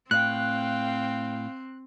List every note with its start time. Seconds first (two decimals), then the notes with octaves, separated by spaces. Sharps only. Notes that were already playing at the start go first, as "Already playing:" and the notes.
0.11 A2 C4 F5 G5 F#6